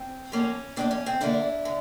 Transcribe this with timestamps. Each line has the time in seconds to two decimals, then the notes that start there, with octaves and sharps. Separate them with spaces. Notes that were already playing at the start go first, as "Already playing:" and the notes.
Already playing: C4
0.32 A2 F3 A#3 C#4
0.76 A2 F3 A#3 C4 D4
0.91 C#4
1.06 C4
1.21 D3 F3 A#3 D4 E4
1.65 D3